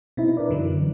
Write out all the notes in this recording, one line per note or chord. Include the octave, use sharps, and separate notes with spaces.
B2 C4 D#4 E4
D4 A#4 B4 D5
F#2 D3 E3 F#3